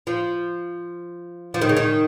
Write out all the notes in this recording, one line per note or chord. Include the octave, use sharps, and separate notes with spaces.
F3
F3
D#3
C#3
D#3